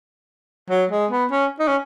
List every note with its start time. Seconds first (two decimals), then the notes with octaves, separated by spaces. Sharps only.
0.70 F#3
0.91 G#3
1.11 B3
1.31 C#4
1.59 D#4
1.68 C#4